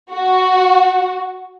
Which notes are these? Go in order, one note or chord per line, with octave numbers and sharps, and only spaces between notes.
F#4